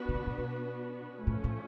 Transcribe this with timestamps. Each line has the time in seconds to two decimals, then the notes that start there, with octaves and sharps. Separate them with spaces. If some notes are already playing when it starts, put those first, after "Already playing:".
Already playing: B3 D4 F#4 B4
0.09 C3
0.15 C#3
0.27 A#2
0.38 B2
1.27 A2 F3 A3 C#4
1.44 A2